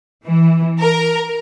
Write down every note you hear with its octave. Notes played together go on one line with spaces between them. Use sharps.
E3
A#4